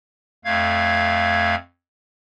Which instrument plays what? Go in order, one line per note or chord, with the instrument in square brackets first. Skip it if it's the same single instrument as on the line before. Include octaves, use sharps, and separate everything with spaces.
[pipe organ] F2 A3 F5 G#6